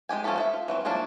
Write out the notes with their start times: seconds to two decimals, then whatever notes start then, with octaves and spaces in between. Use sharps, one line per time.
0.09 G#3 D#4 G4 G#5
0.24 F3 C#4 G4 A4 B5
0.36 A4 B4 E5
0.53 F4
0.68 E3 F#3 C4
0.85 F3 F#3 A#3 D4 E4